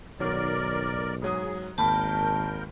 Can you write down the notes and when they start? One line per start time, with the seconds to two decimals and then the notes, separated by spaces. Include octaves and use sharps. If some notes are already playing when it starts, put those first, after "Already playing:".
0.20 B1 D#3 F#3 A#4 D5
1.22 G#2 F#3 G#4 D#6
1.78 G#1 D#2 A#4 A5 B5 G6